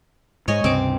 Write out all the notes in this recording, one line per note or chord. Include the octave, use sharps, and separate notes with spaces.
G#2 G#3 C#5 D#5 G#5
C#2 G2 C3 C4 D6